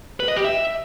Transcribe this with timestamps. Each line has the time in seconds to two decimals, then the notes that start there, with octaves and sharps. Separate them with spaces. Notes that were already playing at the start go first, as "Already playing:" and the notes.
0.20 B4
0.28 D#5
0.36 G4
0.45 E5